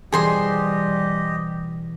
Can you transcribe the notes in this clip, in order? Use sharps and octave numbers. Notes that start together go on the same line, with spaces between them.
B2 E3 G3 G4 G#4 C5 D#5 C6